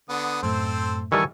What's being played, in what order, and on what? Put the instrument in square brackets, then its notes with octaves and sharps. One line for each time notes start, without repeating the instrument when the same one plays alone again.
[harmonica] D3 B3 D#6
[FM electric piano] F#2 A2 A3 [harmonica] C4 A4 C5
[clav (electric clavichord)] D#3 E3 G3 [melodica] A4 G#5 C#6